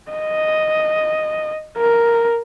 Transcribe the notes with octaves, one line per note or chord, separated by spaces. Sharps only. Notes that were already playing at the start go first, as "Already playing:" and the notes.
D#5
A#4